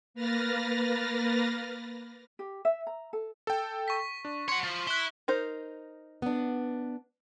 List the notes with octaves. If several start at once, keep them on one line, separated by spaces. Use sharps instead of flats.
A#3 B4 F6 A6 A#6
G4
E5
A#5
A4
A4 G5
C#6 B6
D4
C#5 F#5 C6
F3
E4 E5 F#6 G7
D#4 A#4 C5
B3 D4